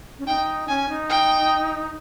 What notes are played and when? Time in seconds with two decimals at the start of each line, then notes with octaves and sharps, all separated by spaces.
0.19 C#4
0.27 D#4 G5
0.68 C#4 G#5
0.89 D#4
1.09 G5